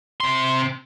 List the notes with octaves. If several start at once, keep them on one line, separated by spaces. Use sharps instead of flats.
C3 C6